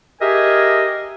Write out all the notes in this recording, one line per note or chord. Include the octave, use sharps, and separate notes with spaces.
G4 G#4 A#4 D#5 E5 G#5